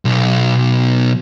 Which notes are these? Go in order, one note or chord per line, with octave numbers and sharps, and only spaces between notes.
B1